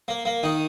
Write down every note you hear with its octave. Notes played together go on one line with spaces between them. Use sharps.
A#3
A#3
D#3 D#4